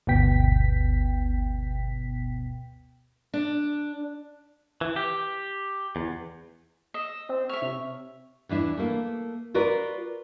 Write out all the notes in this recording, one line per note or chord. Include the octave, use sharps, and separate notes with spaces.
G1 D2 B2 B3 G5 B6
D4
E3
G4
E2
D#5 E6
C4
C#5 E5 F6
C3
E2 E3 D4 E4
A3 A#3
F4 F#4 A#4 B4 D5